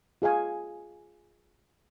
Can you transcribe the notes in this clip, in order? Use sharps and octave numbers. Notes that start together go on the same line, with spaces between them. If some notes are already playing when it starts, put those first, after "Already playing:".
F4 G#4 F5 G#5